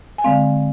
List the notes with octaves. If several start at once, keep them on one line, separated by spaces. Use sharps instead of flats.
G#5
D3 G#3 C4 F5